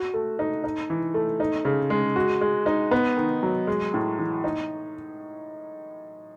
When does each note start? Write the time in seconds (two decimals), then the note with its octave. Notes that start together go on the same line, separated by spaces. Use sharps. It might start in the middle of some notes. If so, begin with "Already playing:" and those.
Already playing: F#4
0.14 A3
0.39 D#4
0.64 D#4
0.90 E3
1.14 A3
1.40 D#4
1.65 C#3
1.90 G#3
2.16 F#4
2.41 G#3
2.66 D#4
2.91 B3
3.17 D#3
3.43 F#3
3.67 G#3
3.94 A2
4.19 E3
4.44 D#4